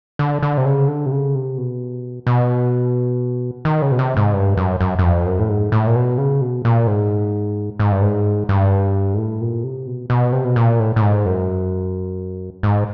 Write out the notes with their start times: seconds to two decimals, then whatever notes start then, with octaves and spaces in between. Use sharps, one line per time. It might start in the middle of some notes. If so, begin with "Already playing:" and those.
0.19 D3
0.42 D3
0.57 C3
0.66 C#3
0.88 D3
1.06 C3
1.12 C#3
1.35 C3
1.58 B2
2.27 B2
3.65 D#3
3.82 C#3
3.91 B2
3.99 C3
4.17 G#2
4.33 G2
4.57 F#2
4.81 F#2
4.99 F#2
5.03 F2
5.26 F#2
5.39 A2
5.49 G#2
5.72 A2
5.87 A#2
5.96 B2
6.18 C#3
6.41 B2
6.65 A#2
6.87 G#2
7.79 G#2
7.92 G2
8.02 G#2
8.49 G2
9.14 G#2
9.18 A2
9.41 A#2
9.64 C3
9.87 B2
10.10 B2
10.32 C3
10.44 B2
10.56 A#2
10.79 A2
10.96 A2
11.02 G#2
11.26 F#2
12.63 G#2